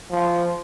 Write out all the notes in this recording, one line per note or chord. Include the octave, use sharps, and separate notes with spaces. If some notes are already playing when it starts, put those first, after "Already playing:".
F3